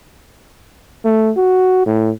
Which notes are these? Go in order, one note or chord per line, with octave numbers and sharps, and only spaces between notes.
A3
F#4
A2